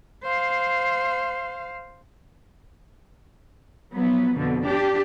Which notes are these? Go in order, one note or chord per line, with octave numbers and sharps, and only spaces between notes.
C5 F5
F3 F#3 B3
F2 B2 D3
D4 G4